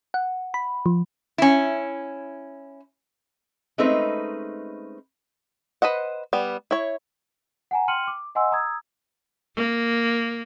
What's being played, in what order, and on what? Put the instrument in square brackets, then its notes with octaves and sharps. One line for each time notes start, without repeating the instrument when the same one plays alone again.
[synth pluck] F#5
B5
F3
[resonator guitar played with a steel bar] C#4 E4
G#3 A3 C4 C#4 D#4 B4
[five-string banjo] B4 C5 D#5 F#5
G3 B3
E4 C#5
[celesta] F#5 G#5 A#5
G5 C6 F6 C#7 D#7 F#7
D6
D#5 F#5 G#5 C6 E6
A#5 D#6 E6 G#6
[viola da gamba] A#3